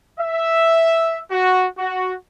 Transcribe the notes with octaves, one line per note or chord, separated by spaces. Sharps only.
E5
F#4
F#4